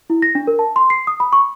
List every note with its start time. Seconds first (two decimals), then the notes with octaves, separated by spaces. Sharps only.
0.10 E4
0.22 A#6
0.35 D4
0.47 A#4
0.59 A5
0.76 C6
0.90 C7
1.07 D#6
1.20 B5
1.33 C#6